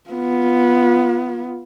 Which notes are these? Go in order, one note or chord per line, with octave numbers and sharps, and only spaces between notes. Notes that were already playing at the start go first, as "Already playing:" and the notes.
B3 F4